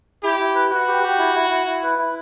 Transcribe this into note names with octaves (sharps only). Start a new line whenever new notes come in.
E4 G4
E4
B4
F#4 B4
G4
G4
E4
E4
E4
E4
B4
E4